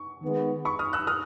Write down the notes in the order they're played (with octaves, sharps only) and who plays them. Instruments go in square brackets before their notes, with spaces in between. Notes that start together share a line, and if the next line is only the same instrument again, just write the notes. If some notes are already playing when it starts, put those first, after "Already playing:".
Already playing: [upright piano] C#6
[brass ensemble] D#3 G#3 B3
[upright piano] B5 C#6
D#6 F6
E6 F#6
D#6 F6